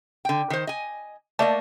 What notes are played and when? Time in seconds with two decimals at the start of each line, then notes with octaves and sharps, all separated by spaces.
0.25 D3 G5
0.50 D#3 C5
0.67 D#5 G#5
1.39 A3 A#3 D5 D#5 A5